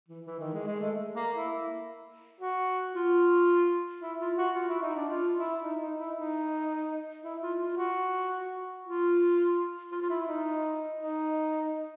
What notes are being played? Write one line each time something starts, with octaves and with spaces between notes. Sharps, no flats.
E3
E3
D#3
G#3
G#3
A3
A#3
E4
F#4
F4
E4
F4
F#4
F4
E4
D#4
D4
F4
E4
D#4
D#4
E4
D#4
E4
F4
F4
F#4
F4
F4
F4
E4
D#4
D#4